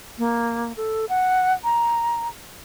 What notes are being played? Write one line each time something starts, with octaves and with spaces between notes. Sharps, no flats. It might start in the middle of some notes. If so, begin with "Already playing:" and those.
A#3
A4
F#5
A#5